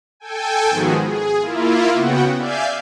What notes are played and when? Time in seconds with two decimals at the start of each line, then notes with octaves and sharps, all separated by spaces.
0.20 A4 G5 G#5
0.70 G#2 D#3 F3 B3 F#4 G#4
1.07 G#4
1.40 A#3 E4 F4
1.93 C#3 B3 F#4 F#5 G5
2.37 D5 E5 F5 G#5 G6